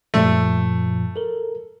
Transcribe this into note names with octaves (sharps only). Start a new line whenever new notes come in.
F#2 A#2 F3 A3
A4 A#4